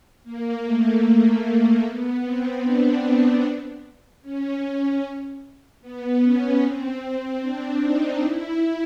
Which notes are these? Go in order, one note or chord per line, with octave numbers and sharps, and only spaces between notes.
A#3
A3
A3
A3
B3
C4
D4
C#4
B3
C#4
C4
C4
D4
D#4
E4